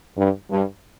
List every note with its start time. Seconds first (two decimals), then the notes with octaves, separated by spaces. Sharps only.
0.17 G2
0.51 G2